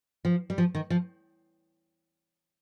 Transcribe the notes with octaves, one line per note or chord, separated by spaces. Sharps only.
F3
G3
F3
D#3
F3